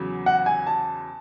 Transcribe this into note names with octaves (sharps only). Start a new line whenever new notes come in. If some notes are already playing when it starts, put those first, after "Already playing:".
Already playing: E2 C#3 F#3
F#5
G#5
A5